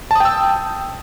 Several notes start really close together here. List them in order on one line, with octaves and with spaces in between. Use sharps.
A5 D#6 G5 E6